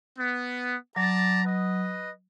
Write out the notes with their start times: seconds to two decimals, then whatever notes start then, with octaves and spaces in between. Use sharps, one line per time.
0.17 B3
0.96 F#3 D5 A5 A#5
1.45 B4 D#5